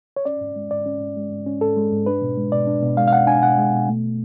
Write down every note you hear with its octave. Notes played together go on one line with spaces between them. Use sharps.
C#5
C#4 D5
G#2
G#3
G#2 D5
C#4
G#2
G#3
G#2
C#4
G#2 A4
G#3
G#2
D4 B4
B2
G#3
B2 D5
D4
B2
G#3 F5
F5
B2 F#5
D4 G#5
B2 F#5
G#3
B2
A3